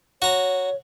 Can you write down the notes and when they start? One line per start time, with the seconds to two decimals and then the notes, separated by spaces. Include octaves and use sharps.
0.22 F#4 C#5 A#5